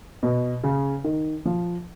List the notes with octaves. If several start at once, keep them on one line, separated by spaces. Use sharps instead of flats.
B2
C#3
D#3
F3